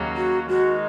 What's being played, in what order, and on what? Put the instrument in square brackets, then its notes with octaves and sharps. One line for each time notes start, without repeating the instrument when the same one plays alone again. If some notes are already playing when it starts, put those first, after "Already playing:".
Already playing: [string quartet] D#2 C#3 F#3 A#3
[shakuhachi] F#4
[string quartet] D#3 G#3 D#4 [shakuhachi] F#4